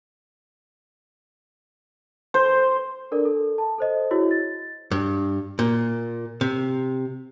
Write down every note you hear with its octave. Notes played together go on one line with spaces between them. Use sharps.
C5
D4 A4 A#4 D5
A4
A5
A4 C5 D#5
E4 F#4 G#4 C#5
A6
G2
A#2
C3